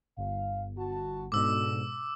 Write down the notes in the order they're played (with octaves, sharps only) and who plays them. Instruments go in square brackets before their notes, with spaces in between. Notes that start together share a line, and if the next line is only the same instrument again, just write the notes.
[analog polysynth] G1 [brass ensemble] F5
[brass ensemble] F#4 A5
[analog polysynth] G#2 B2 [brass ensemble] D4 A4 [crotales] D6 E6